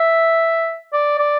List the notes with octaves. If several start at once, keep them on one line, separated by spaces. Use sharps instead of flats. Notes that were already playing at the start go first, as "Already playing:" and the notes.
Already playing: E5
D5
D5